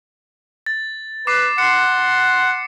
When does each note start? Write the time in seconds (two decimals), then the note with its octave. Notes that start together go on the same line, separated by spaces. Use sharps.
0.66 A6
1.27 B4 D6 C7
1.58 F#5 C6 C7 C#7